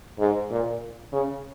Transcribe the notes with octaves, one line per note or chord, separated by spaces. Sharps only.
G#2
A#2
C#3